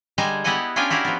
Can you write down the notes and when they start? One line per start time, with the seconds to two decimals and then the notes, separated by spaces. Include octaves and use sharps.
0.18 D3 G3 G#3 G#5 A#5
0.44 B3 E4 G4 D#5 F#5 G#5
0.76 C#4 D4 F4 A#4 G5 G#5
0.90 E4 F#4 G4 A#4 F5
1.04 F3 B3